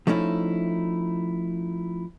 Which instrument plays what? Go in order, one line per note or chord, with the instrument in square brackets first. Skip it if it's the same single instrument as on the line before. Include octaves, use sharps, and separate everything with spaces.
[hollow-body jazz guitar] F3 A3 C#4 D#4 E4